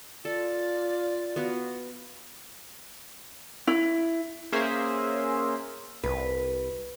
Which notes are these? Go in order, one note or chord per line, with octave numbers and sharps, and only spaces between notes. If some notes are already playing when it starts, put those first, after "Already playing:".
F4 A4 D5
B3 F#4 F5
E4
A#3 C#4 G#4 C5 E5
C2 B4